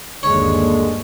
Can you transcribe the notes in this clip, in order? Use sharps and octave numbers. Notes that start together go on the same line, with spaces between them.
G1 D#2 D3 G#3 C#5